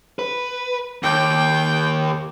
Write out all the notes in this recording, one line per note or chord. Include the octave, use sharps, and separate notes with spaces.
B4
D#2 G5